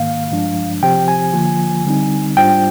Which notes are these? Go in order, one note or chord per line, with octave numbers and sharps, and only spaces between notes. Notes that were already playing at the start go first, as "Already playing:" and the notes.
Already playing: G#2 D#3 A#3 F5
G2 F3 G#3 D4
C3 F3 C4 G4 C5 G5
G#5
D3 F3 A#3 F4
D3 G3 C4 D#4
G#2 G3 D4 F4 C5 G5